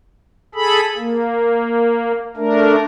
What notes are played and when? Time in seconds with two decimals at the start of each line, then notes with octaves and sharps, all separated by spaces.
0.55 G#4 A4 B5
0.97 A#3
2.37 A3 D4 A#4